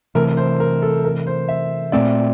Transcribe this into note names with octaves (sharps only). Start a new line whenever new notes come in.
C3 E3 A3 A#4
C5
A#4
A4
A#4
C5
E5
A#2 A3 C4 D5